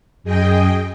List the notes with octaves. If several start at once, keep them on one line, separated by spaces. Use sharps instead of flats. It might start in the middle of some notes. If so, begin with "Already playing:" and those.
F#2 G#4 D#5 G5